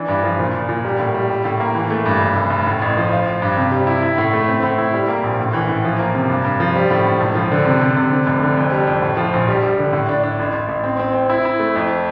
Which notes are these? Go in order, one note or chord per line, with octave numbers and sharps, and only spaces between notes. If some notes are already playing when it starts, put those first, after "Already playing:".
Already playing: E3 D4
G2
F3
A#2
A#2
A#2
G3
A2
G3
G3
A2
A#3
E3
A3
G2
F1
F1
F1
A2
A1
F3
F4
F4
G2
C3
G3
E4
E4
A2
A3
C4
A2
E4
G3
A#3
A#1
A2
E3
A2
F3
A#3
C3
G2
G2
F3
G3
A2
A2
E1
F3
D3
C3
C3
C3
D3
F1
D3
F2
G3
F2
A2
F3
A#1
G3
G3
D3
A2
D4
D4
A1
A1
A1
C4
C4
C4
E4
E4
A3
F2